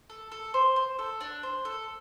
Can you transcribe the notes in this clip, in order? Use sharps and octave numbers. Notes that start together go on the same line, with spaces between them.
A4
A4
C5
C5
A4
D4
C5
A4